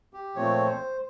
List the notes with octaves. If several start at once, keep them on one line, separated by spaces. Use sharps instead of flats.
G4
A#2 F3 A3 C4 C#5
C5